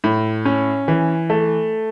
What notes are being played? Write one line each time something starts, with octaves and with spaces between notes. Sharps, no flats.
A2
C#4
E3
A3